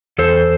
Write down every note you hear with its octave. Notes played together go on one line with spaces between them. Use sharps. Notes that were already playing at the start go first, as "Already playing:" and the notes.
E2 A4 C5